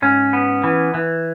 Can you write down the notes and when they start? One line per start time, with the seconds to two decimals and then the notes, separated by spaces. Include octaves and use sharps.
0.02 G#2 C#4
0.33 B3
0.64 E3
0.94 E3